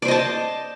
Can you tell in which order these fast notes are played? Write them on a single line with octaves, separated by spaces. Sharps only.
D5 C5 D#5 A5